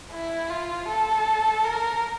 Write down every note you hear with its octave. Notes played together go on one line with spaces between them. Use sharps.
E4
F4
A4
A#4